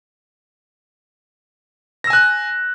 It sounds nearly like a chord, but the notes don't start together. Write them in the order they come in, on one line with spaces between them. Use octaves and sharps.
A#6 E6 G#5 F#6